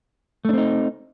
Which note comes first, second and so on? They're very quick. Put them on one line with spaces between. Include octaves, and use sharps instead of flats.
A3 D4 C4 D#4